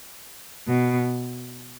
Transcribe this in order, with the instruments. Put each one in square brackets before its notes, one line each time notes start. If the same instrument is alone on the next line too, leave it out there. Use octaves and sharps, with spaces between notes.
[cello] B2